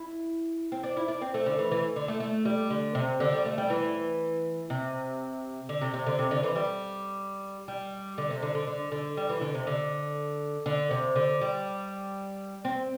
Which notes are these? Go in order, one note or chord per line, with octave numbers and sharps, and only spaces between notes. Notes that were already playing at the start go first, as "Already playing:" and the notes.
Already playing: E4
C4
D4
E4
D4
C4
A3
D3
E3
E3
D3
A3
A3
G3
D3
C3
D3
G3
A3
G3
E3
C3
D3
C3
C3
D3
C3
D3
E3
G3
G3
D3
C3
D3
D3
D3
D3
G3
E3
D3
C3
D3
D3
C3
D3
G3
C4